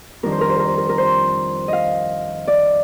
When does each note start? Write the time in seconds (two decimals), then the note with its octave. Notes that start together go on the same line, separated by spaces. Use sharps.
0.23 F2 D#3 G3 D4 A#4
0.32 C5
0.41 A#4
0.50 C5
0.59 A#4
0.68 C5
0.78 A#4
0.89 A#4
0.98 C5
1.68 D#5 F5
2.47 D5